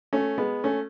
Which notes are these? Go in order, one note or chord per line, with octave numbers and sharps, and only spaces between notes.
A3 C#4
G#3 B3
A3 C#4